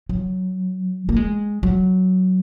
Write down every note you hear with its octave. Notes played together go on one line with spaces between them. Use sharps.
F#3
A#3
G#3
F#3